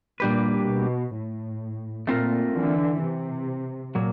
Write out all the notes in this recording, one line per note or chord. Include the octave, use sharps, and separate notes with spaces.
A#2 G3 A#3 D4 G4 B4
B2
A2
A#2 A3 C4 F4 A#4
D3 E3
C3
A#2 F#3 A#3